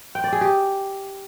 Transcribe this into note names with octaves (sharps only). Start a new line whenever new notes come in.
G5
D5
G#4
G4